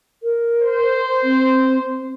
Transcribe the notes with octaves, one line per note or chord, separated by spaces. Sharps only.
A#4
C5
C4